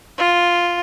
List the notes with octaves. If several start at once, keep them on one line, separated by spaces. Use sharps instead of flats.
F4